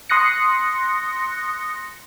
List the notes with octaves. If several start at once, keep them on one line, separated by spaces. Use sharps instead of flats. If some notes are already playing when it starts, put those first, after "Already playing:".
C6 D#6 F#6 A#6 C#7